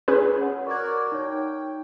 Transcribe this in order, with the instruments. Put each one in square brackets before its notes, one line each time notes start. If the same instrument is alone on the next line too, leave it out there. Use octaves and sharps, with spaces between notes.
[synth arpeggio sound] C#4 G#4 B4
[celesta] C#5 F#5
[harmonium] F#4 A#4 D5 [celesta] C#6 G#6
[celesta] D#4 C#5 [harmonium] G5